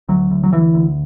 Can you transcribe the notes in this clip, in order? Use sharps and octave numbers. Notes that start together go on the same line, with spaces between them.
D2 F#3
D2
F#3
D2 E3
D2